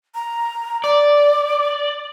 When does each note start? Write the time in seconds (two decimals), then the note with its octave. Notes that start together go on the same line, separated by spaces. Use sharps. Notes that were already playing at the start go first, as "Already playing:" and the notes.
0.15 A#5
0.84 D5 D6